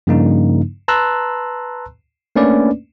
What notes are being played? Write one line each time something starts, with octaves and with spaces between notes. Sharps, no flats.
G2 C#3 F3 A#3 D4 D#4
B4 A5 A#5 C6 E6 F#6
A3 A#3 C#4 D4 B4 D5